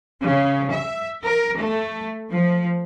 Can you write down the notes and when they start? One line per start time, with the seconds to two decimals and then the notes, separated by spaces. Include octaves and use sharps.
0.20 C#3
0.71 E5
1.25 A#4
1.58 A3
2.30 F3